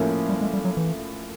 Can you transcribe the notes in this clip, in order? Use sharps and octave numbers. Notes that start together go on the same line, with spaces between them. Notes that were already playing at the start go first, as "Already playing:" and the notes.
Already playing: A2 F3 A#3 C#4 E4
G3
G#3
G3
F#3
E3